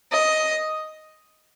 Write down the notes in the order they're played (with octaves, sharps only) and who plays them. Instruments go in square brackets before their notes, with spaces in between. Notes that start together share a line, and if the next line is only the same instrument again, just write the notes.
[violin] D#5